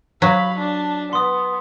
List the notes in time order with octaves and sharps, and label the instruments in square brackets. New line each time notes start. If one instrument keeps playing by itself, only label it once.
[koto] F#3 [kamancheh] F5 B5 [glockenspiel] B6
[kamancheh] D4 A5
[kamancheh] B3 [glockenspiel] C6 D#6